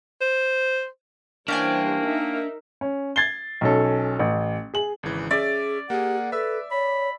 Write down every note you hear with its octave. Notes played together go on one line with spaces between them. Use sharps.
C5
E3 G3 A#3 C#4 D4 C5 G5 G#5
D#4 A#4 E5
C#4
G#6 A6 C7 G7
B1 C#4 A4
A1
G#4 F#7
G#1 C#3 E3
C#4 G#4 D5 E5
A#3 G4 G#4 F#5
A4 B4 E5 E6
C#5 B5